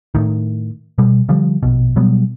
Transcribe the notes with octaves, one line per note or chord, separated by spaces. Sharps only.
A2 D#3
B2 G3
D3 F3 G3
A#1 B2
B2 F#3 G3 B3